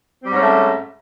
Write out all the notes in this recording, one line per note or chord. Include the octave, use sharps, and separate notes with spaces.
G#2 G3 A3 C4 C#4